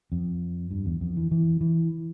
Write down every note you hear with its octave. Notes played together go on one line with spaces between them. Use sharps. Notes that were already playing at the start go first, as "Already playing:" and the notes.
F2
G2
E2
F2
E3
E3
E3